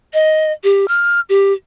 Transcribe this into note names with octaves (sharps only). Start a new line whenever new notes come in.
D#5
G4
F6
G4